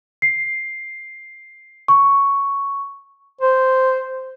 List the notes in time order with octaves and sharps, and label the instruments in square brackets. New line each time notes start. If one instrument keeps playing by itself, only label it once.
[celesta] C7
C#6
[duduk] C5